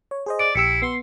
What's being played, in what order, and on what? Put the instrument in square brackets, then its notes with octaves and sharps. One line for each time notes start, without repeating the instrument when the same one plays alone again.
[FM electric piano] C#5
G#4 C5 D#5
[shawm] D5 [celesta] D7
[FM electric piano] A#1 G4 E6 [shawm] E4 [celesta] C#7
[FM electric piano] B3 [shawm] C6